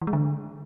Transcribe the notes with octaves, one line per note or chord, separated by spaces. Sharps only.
E3
G#3
D3